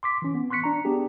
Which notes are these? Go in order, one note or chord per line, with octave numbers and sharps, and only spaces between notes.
C6 D6 B6
E3 C#4
B3
C6 C#6 F#6 B6 C#7
D4 A#5
B3 D4 G4 G#4